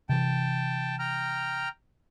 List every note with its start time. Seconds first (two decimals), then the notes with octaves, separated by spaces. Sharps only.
0.09 C3 E3 G5 A5
0.99 G5 A#5 F6